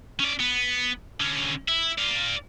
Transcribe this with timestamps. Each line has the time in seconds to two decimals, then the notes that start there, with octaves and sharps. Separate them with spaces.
0.20 C#4 D5
0.39 B3
1.20 D3 C#4
1.68 E4
1.98 D5 F5